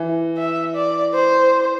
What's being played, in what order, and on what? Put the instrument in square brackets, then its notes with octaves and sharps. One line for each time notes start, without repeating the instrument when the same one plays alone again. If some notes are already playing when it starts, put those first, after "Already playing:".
Already playing: [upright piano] E3
[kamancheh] E5
D5
C5